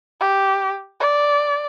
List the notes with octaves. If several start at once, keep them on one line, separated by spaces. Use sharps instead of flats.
G4
D5